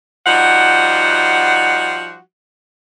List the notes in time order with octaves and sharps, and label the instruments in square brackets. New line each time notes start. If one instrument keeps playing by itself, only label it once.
[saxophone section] F3 G3 D#4 F#4 F#5